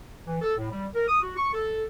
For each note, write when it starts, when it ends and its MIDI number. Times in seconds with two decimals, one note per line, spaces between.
0.27 0.39 52
0.42 0.53 69
0.58 0.69 45
0.72 0.86 55
0.95 1.06 70
1.08 1.20 87
1.22 1.36 66
1.37 1.49 85
1.54 1.84 69